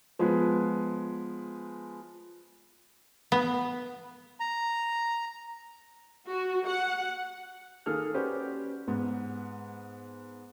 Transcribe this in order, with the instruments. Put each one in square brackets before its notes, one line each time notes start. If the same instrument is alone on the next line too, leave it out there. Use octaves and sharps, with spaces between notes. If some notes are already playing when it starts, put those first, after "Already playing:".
[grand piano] F3 G#3 B3 G#4 B4
[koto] B3
[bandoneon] A#5
[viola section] F#4
F#5
[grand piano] D#3 A#3 G#4 A4 F6
C#4 F#4 G4 B4 C5 D5
G#2 B3